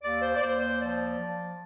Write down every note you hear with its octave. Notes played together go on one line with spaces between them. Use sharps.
D#2 D5
C5
D5
D#2 C5
C5
F3 D5
F3